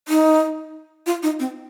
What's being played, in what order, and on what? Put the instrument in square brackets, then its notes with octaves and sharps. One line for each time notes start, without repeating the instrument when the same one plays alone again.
[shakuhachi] D#4
F4
D#4
C4